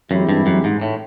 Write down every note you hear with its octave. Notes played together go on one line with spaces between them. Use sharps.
F#2 E3 G#3 C4 E4 G4
G2
F#2
G#2
A2